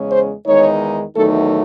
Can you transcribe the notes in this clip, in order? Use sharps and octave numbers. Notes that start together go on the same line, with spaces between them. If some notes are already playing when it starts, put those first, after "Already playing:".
Already playing: E2 C#3 G#3 C#4
C5
E2 D#3 G#3 D#4 C#5
E2 D#3 F#3 A3 D#4 A4